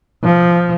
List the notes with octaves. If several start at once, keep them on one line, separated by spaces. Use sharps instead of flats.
F3